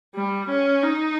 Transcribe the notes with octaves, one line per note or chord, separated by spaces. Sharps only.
G3
C#4
D#4